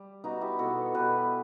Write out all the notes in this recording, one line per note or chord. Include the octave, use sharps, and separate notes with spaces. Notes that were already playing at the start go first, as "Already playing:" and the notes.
Already playing: G3
B3 D#4 F#4
E4 G4
B2 F#4 A4
B2 G4 B4